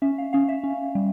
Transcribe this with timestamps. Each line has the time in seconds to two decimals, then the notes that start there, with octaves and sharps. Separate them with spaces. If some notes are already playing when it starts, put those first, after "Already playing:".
0.02 C#4 E5
0.18 F5
0.33 C#4 F5
0.49 E5
0.64 C#4
0.95 G3